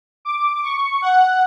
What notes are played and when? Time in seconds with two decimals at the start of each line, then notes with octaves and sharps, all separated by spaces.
0.25 D6
0.63 C#6
1.02 F#5